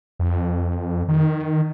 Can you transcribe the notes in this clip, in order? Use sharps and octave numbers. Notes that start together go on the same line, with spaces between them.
F2
D#3